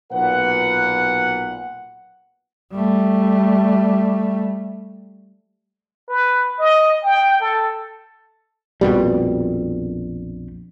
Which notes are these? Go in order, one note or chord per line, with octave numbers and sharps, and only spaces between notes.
B1 A#2 B4 F#5
G3 A3
B4
D#5
G5
A4
A#1 F2 B2 G3